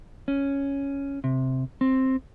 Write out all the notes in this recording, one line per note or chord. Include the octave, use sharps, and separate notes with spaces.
C#4
C3
C4